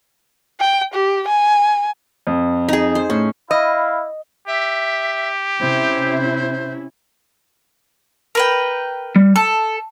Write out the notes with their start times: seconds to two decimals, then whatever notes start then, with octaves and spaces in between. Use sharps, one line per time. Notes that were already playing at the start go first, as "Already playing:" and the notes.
0.60 G5
0.94 G4
1.28 G#5
2.27 F2
2.69 D#4 G#4
2.95 C5
3.10 A2 C#4
3.51 E4 D#5 F5 B5
4.48 G4 E5
5.60 C3 C#4 E4 C5
8.35 A#4 B4 G5
9.16 G3
9.36 A4 A5